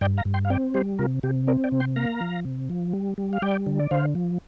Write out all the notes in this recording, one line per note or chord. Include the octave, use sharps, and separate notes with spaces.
G2 D5 G5
F5 A#5
G2
G5 C6
F5
C4 D5 G5
G3 G4 C5
C3 F4 A#4
C3 G4
C4 A#4 D5
D5 G5
C3
G5 C6
A#3 F5 A#5
F3
C3
F3
G3
G3
F5
G3 D5 G5
D3
D5
D3 C5 F5
F3